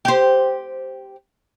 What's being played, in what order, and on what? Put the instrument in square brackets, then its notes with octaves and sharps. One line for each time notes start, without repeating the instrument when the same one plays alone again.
[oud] G4 C5